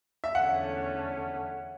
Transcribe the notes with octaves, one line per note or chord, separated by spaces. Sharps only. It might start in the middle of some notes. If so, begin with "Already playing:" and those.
E5
E2 D3 A3 C#4 F#5